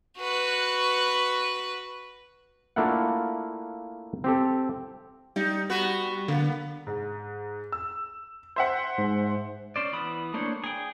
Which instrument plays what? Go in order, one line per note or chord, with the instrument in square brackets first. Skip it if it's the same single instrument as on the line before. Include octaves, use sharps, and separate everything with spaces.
[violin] F#4 B4
[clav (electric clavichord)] A3 A#3 D4 E4 F4 F#5
C4 G4 A4
[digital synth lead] G3 [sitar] D#4
[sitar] B3 F#4 B4
[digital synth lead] D3 [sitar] A#3 B3
[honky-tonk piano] G#2
E6
C5 E5 F#5
[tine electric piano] G#2
[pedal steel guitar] C#4 C5 D5
E3 B3 B5 D#6
A3 A#3 D4 C5 C#5
G#4 G5